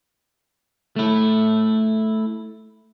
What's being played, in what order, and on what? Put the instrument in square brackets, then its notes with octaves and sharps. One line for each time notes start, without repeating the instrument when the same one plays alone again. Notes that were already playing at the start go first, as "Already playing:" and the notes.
[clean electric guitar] A3 E4